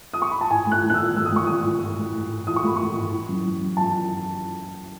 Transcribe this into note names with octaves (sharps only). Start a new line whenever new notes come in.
D#6
C#6
B5
A5
A2 G#5
A3
F#6
A2
F#6
E6
E3
A3 E6
D#6
A3 C#6
A3 D#6
A2
A2
A3
A2
A2
E3 D#6
C#6
A3 B5
A2 C#6
A2
E3
F#2
E3
F#2
A5